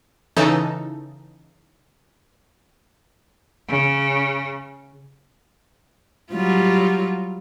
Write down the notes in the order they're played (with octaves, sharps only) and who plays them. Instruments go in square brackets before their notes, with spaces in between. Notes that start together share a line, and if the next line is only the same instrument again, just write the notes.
[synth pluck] C#3 E3 D#4 A4
[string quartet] C#3
[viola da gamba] F#3 G3 F4